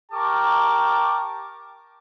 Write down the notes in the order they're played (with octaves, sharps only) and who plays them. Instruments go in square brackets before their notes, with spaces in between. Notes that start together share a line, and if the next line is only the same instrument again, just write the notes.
[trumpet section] G4 A#4 A5 C#6 D6